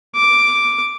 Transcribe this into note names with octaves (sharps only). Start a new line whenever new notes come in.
D6